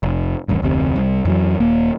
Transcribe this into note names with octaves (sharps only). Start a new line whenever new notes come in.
F1
D#1 A1 G2
F1 D2 C3
C2
F2 E3 F#3
D#1 A#3